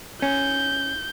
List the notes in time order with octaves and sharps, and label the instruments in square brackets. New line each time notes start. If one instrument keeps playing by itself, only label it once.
[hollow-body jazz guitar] C#4 [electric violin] G6